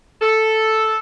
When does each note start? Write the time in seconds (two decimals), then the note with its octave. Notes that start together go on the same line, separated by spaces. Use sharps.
0.22 A4